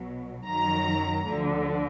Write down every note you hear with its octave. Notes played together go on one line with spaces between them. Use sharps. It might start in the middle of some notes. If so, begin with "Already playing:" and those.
Already playing: B1 B2 F#3
F#2 D#3 F#3 A#5
D2 D3 F3